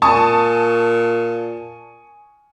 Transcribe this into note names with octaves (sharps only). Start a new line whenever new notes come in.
A#2 G#5 A5 C#6 D#6